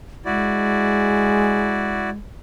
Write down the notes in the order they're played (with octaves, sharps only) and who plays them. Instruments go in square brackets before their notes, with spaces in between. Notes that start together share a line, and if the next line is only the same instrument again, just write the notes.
[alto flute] G#3 [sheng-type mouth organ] E4 F#4 D5